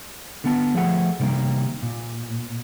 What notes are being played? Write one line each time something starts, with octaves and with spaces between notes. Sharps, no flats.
D3 B3 A5
F3 A3 G#4 F#5
C3 D#3 G3 A#3
A#2